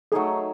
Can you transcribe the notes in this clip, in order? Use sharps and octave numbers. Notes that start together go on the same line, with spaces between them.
F#3 A3 D#4 G#4 A4